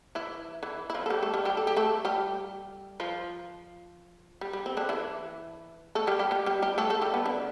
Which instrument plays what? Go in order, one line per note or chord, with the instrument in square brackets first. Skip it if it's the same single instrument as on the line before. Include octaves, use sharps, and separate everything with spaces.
[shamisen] E3 E4
E3 E4
E4
F3 F4
A4
G3 G4
A3 A4
G3 G4
G3 G4
A4
G4
A3 A4
G3 G4
F3 F4
G3
G3
C4
D3 D4
E3 E4
A3 A4
G3 G4
G3 G4
G3 G4
G3 G4
G3 G4
A3 A4
A3 A4
G3 G4
B3
D3 D4